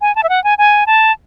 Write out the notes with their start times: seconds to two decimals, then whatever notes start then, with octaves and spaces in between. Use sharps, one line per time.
0.01 G#5
0.15 A5
0.23 E5
0.29 F#5
0.44 G#5
0.58 G#5
0.87 A5